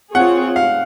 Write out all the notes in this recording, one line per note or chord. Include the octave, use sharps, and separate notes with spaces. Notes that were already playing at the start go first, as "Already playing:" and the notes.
C4 F4 G#4 C#5 F#5
F5